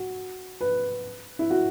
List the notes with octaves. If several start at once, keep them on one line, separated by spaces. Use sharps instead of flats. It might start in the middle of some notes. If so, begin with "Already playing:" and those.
Already playing: F#4
B4
E4
F#4